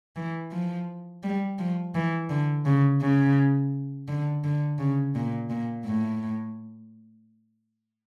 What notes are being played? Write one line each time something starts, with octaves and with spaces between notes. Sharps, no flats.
E3
F3
G3
F3
E3
D3
C#3
C#3
D3
D3
C#3
A#2
A#2
A2